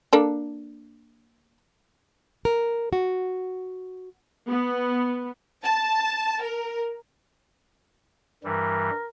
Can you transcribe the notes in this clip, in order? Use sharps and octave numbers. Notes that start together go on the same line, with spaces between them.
A#3 D4 A4
A#4
F#4
B3
A5
A#4
G2 E3 G3 A#4